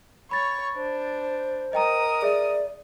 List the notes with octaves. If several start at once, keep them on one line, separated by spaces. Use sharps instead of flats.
C#5 B5 C#6 A6
D4 C5
A#4 D#5 G5 A#5 D#6
G#4 D5 E5